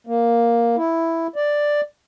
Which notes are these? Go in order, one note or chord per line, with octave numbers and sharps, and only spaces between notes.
A#3
E4
D5